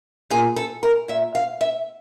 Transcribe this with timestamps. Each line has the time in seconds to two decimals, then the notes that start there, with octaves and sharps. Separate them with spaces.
0.30 A#2 G#4
0.56 A4
0.83 A#4
1.08 A#2 E5
1.35 F5
1.61 E5